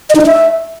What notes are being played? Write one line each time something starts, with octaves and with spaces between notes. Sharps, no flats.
D#5
D#4
D#5
E5